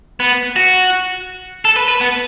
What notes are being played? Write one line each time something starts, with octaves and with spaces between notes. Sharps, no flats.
B3
F#4
A4
B4
B4
B3